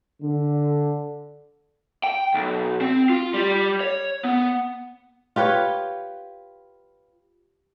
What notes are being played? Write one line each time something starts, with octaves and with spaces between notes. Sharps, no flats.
D3
G5
B1
C4
F4
G3
C#5
B3
F4 G4 B4 C#5